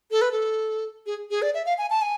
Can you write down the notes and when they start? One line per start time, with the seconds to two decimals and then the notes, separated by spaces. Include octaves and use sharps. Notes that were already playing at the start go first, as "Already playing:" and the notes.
0.11 A4
0.21 B4
0.32 A4
1.06 G#4
1.31 G#4
1.42 D5
1.54 E5
1.66 F5
1.78 G#5
1.90 A5
2.02 G#5